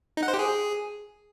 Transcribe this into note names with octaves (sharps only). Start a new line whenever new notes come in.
D#4
F#5
C5
G4
G#4